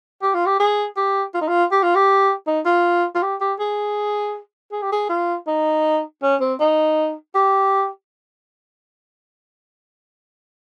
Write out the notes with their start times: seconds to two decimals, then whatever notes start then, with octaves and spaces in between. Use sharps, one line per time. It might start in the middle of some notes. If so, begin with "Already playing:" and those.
0.22 G4
0.34 F4
0.46 G4
0.60 G#4
0.97 G4
1.34 F4
1.41 D#4
1.48 F4
1.72 G4
1.83 F4
1.95 G4
2.47 D#4
2.65 F4
3.15 F4
3.22 G4
3.41 G4
3.60 G#4
4.72 G#4
4.82 G4
4.92 G#4
5.09 F4
5.47 D#4
6.23 C#4
6.41 C4
6.60 D#4
7.35 G4